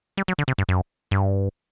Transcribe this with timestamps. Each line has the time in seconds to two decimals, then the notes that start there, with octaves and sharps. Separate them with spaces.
0.17 G3
0.28 F#3
0.38 D3
0.48 C3
0.58 G2
0.69 F#2
1.11 G2